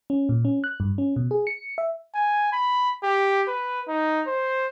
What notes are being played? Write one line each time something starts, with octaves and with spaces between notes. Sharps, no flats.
C#4
A#2
C#4
F#6
G2
C#4
B2
G#4
C#7
E5
G#5
B5
G4
B4
D#4
C5